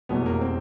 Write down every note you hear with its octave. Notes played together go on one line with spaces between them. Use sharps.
F1 E2 B2 F#3 B3
A#3
C4